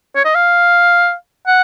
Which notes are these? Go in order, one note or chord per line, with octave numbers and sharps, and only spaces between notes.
C#5
D#5
F5
F#5